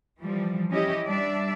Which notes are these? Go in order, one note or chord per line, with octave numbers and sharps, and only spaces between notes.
E3 F3 G3
C#4 E4 G4 D#5
G3 D4 D5 E5